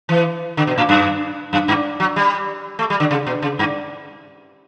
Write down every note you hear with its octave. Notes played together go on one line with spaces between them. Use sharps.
E3
D3
B2
A2
F#2
F#2
G2
F#3
G3
A3
G3
D3
C#3
B2
C#3
G2